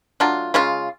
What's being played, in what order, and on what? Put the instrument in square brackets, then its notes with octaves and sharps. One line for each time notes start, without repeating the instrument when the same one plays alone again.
[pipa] F#3 A3 D4 F4
C#3 G#3 C#4 F4